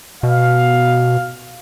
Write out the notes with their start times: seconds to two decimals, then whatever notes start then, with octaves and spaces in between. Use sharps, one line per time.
0.23 B2 F5